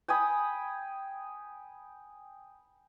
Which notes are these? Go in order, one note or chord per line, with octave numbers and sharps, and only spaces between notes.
G5 G#5 B5 D#6